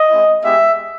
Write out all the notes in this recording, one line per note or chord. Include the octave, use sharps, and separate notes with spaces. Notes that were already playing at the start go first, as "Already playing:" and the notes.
Already playing: D#5
G#3 C4 E4
G#3 B3 E4 G4 E5